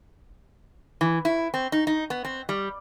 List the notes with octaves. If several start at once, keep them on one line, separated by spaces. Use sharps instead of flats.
E3
E4
C4
D#4
D#4
B3
C4
G3